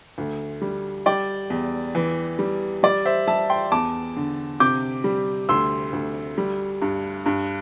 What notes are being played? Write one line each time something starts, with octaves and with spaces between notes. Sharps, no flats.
D2
G3
G3 D5 G5
E2
E3
G3
G3 D5
C5 E5
G3 E5 A5
G5 C6
E2 A5 D6
D3
C3 D6 G6
G3
D2 C6 E6
D2
G3
G2
G2